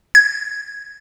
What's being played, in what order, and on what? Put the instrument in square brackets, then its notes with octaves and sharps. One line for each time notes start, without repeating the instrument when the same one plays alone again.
[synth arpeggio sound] G#6